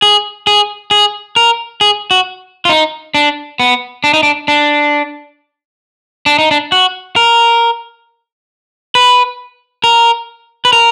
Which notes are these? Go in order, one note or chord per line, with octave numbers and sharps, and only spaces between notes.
G#4
G#4
G#4
A#4
G#4
F#4
F4
D#4
D4
B3
D4
D#4
D4
D4
D4
D#4
D4
F#4
A#4
B4
A#4
B4
A#4